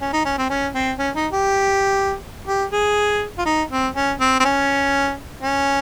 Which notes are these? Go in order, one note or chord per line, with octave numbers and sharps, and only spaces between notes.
C#4
D#4
C#4
C4
C#4
C4
C#4
D#4
G4
G4
G#4
F4
D#4
C4
C#4
C4
C4
C#4
C#4